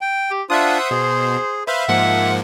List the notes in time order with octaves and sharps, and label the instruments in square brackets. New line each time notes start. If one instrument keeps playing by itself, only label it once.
[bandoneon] G5
[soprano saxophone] G4
[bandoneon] D4 F4 [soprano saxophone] C5 [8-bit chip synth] E5 F#5 D#6
[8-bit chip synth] B2 [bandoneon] G#4
[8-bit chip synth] B4 C5 F5 [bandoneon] E5
[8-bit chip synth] G#2 F3 A#3 [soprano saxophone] F#5